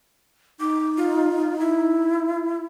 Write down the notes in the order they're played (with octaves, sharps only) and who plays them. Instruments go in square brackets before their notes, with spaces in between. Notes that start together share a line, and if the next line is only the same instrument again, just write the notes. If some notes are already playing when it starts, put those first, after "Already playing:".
[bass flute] D#4 [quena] D6
[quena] F4
E4